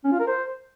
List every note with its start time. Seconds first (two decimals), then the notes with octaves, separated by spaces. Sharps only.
0.04 C#4
0.12 F4
0.20 A#4
0.28 C5